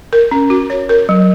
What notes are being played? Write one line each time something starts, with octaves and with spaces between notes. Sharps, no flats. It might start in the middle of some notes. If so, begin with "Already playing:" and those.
A#4
C#4
F#4
C#5
A#4
F#3